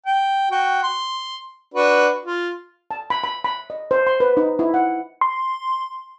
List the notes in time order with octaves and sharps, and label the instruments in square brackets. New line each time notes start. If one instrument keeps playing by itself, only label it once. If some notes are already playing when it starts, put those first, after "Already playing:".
[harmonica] G5
F#4 G5
C6
D4 F#4 B4
F4
[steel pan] A5
B5
B5
B5
D#5
C5
C6
B4
D#4
E4
F#5
[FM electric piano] C6